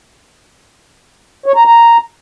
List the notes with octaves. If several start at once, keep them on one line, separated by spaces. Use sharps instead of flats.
C#5
A#5
A#5